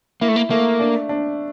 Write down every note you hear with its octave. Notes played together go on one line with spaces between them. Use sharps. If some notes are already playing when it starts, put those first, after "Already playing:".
A#3 E4
A3
A#3
A3 A#3
D4
D4